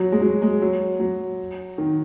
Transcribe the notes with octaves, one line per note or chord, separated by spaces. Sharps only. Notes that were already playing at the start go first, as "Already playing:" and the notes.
Already playing: F#3
G#3
F#3
G#3
F#3
F#3
D#3